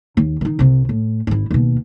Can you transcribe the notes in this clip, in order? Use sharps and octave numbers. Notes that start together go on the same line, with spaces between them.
D#2
D#3 D#4
C2 C3
A2
G#1 E4
D#2 B2